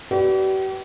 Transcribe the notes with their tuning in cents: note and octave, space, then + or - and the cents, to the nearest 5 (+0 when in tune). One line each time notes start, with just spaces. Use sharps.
G4 -45 B4 +0 D5 +0